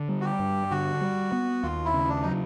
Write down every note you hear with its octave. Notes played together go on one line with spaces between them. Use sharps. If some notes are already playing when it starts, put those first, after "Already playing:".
Already playing: D3
G3
F#4
G4
G2
D3 F#4
G3
B3
D#2 F4
E4
C#3
D4
F#3 D#4